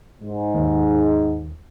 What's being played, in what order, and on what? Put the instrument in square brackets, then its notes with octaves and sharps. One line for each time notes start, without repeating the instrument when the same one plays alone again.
[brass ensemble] G#2
[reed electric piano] D#2